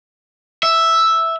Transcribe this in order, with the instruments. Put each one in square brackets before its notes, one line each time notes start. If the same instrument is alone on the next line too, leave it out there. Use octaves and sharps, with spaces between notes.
[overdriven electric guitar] E5